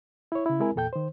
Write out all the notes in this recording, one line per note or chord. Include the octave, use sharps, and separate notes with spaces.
E4 C#5
C#3 E4
G#3 C4 E4 A#4 G#5
E2 A#2 A4 G5 G6
D#3 C5